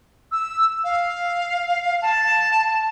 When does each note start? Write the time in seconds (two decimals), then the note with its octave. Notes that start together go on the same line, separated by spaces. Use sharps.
0.32 E6
0.84 F5
2.02 A5